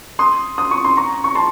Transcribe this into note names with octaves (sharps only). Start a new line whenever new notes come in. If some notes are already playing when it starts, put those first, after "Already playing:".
C6 D#6
D#6
C#6
C6
A#5 C#6
C#6
A5 C6